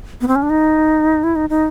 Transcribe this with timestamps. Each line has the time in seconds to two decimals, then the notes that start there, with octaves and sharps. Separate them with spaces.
0.21 B3
0.28 C4
0.36 C#4
0.43 D4
0.50 D#4
1.23 E4
1.35 D#4
1.50 D#4